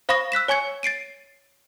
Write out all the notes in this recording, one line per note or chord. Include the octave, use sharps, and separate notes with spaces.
C5 F5 B5 C#6 D#6 A#6
E6 F#6 B6 E7
C#5 G#5 C#6 G#6 C#7
A6 C7 D7 D#7